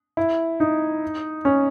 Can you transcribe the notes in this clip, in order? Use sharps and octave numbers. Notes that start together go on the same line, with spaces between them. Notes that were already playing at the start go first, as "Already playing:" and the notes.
E4
D#4
C#4